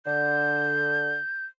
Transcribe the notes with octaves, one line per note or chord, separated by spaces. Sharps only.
D3 G6